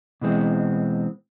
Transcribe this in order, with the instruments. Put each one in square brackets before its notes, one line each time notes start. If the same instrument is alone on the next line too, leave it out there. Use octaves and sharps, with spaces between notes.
[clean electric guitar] B2 E3 G#3 C4